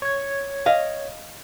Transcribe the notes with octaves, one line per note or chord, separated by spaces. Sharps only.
C#5 G#6
D#5 F5